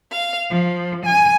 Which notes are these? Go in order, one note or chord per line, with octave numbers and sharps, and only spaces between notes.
F5
F3
G#5